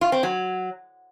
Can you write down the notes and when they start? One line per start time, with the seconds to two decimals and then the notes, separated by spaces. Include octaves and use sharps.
0.01 F4
0.12 C4
0.23 F#3